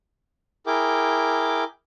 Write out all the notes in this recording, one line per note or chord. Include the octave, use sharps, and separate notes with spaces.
E4 G#4 A#4 G5 D6